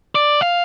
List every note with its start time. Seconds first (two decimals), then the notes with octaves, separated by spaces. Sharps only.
0.15 D5
0.41 F5